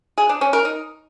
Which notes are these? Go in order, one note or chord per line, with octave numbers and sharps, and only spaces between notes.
G#4
D4
C#4
A#4
D#4